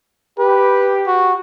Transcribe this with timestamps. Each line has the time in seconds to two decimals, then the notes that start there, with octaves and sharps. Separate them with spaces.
0.39 G4 B4
1.07 F#4